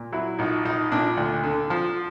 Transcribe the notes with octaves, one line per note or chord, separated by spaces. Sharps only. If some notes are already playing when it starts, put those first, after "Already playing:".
Already playing: A#2
F#3 E4
A#1 D#4
A#1 D#4
A#2 D4
D2
D3
F3